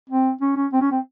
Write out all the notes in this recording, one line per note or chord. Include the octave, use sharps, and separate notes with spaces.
C4
C#4
C#4
C4
C#4
C4